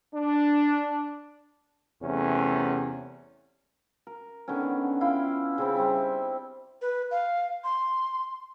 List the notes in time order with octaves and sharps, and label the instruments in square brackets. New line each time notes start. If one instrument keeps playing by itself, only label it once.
[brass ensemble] D4
[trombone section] E2 C3 A3 C#4
[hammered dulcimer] A#4
D3 D#3 B3 C#4
F#5
E4 F4 F5 G5
C#3 C4 E4
G3 C4 E5
[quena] B4
F5
C6